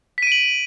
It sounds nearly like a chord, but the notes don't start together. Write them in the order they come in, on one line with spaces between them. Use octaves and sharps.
B6 D#7 D7 F#7